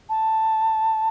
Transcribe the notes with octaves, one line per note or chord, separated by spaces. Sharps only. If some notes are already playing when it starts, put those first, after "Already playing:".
A5